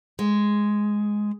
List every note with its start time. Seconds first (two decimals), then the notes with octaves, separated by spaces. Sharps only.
0.19 G#3